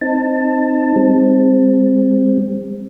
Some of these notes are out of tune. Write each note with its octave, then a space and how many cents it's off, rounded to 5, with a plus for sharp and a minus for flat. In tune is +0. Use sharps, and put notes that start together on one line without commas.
C4 +0 D#4 +0 A5 +15
G3 +45 C4 +0